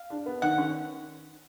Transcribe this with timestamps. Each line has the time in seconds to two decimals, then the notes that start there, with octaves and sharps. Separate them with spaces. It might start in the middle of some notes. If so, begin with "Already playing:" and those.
Already playing: F5
0.10 D4
0.26 B3
0.42 D#3 F#5
0.58 C#4